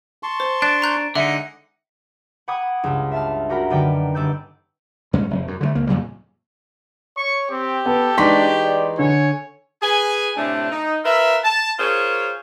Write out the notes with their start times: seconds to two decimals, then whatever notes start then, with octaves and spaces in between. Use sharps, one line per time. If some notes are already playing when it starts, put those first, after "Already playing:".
0.23 A5 C6 C#6
0.40 C5
0.62 D4 F#6
0.82 A#5 F#6 G6
1.15 D3 G#3 D#4 E5 F#5
2.48 F#5 G5 B5 D6 D#6 G#6
2.84 C#2 G2
3.12 E5 A5 F6
3.49 F#4 G4 A#4 F#5 B5
3.70 F#2 D3 D#3 B4 D5 G5
4.15 G1 D5 E6 G6
5.13 G2 G#3 C#4
5.30 F1
5.48 F#2
5.61 D3 F3 A3
5.75 C#2 A#3
5.87 F2 A#2 C#3 G3
7.17 C#5 C#6
7.50 C4 G4
7.86 B3 A4
8.18 E3 G#3 D4 D#4 C6 C#6 B6
8.62 D5
8.99 D3 C#5 G#5
9.82 G#4 B4 G#5
10.37 A2 C3 A3 D4
10.70 D#4
11.04 F4 A#4 B4 E5
11.43 A5
11.79 F4 G#4 A#4 C5 C#5